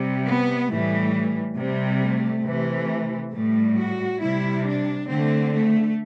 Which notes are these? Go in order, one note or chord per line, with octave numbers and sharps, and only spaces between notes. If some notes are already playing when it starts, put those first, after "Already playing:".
Already playing: C3 G3
B3
A2 E3 G3 A3
C3 G3
A3
C3 E3 A3
A2 G3 A3
F#4
C3 G3 E4
D4
D3 A3 C4
A3